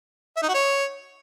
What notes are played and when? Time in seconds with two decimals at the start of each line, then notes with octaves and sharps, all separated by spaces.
0.36 E5
0.42 D#4
0.48 F#4
0.54 C#5